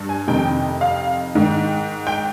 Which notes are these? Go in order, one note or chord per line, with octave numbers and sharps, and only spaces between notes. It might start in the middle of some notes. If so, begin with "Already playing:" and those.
Already playing: G2
G#5
F2 C3 D#3 G5
F5
G#2 D#3
G5